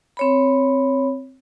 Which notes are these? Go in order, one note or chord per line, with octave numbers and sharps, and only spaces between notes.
C4 C#5 B5